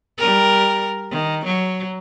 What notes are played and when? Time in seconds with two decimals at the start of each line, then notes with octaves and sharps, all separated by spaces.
0.18 G3 A#4
1.11 D#3
1.45 F#3